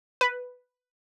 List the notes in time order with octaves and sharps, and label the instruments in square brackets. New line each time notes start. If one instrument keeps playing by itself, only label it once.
[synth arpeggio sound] B4